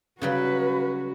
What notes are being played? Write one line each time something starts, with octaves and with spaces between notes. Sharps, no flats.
C#3 F#3 G3 F#4 B4